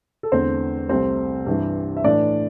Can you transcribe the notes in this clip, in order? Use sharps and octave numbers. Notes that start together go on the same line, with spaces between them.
A4
E2 D3 A3 C4 C5
C2 C3 A3 C4 C5
G2 E3 G3
E5
A2 E3 A3 D4 D5